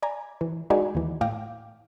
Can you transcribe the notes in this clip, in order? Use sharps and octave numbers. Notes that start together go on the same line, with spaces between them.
D5 G#5 A#5
E3
G#3 D#4 F#4 A#4 D5 G#5
D#2 E3
A2 F5 G5 D6 A#6